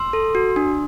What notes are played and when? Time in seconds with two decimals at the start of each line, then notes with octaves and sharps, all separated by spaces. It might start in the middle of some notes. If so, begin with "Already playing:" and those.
Already playing: C6 E6
0.13 A4
0.35 F#4
0.56 D4